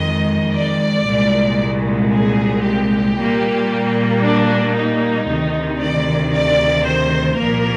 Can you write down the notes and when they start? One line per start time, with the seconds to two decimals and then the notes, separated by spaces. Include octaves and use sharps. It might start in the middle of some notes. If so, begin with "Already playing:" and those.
Already playing: F2 D#3 G#3 D#5
0.54 D5
1.06 C2 A#2 G#3
2.12 G#4
2.64 G4
3.16 A#2 G3 A#3
4.22 D4
4.75 D#4
5.27 D2 C3 D#3
5.80 D5
6.32 D5
6.85 C5
7.38 C2 A#2 F3 A#3 A#4